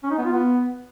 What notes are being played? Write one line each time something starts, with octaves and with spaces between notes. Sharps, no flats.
C#4
D#4
B3
F4
B3